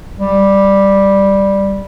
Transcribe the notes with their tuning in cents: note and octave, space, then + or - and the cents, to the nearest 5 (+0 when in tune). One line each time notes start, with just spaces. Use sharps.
G3 +5